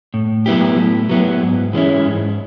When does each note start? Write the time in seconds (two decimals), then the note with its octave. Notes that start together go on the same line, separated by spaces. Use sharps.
0.14 A2
0.46 F#3 B3 E4 G4
0.78 A2
1.09 F#3 B3 E4 G4
1.42 G#2
1.73 E3 G#3 C#4 E4
2.06 G#2